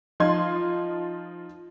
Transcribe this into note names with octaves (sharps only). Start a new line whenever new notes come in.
F3 D#4 F4 C6 G#6